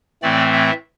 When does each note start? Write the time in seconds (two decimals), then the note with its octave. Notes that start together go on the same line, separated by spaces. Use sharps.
0.22 A2 E3 A3 C4 D5
0.52 E5